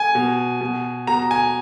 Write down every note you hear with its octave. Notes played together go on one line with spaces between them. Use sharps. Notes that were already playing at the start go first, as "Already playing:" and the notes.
Already playing: G#5
B2
B2
B2 A#5
G#5